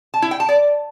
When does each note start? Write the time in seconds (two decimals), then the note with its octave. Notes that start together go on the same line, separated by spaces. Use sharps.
0.14 A5
0.22 E4
0.31 G5
0.40 A5
0.49 D5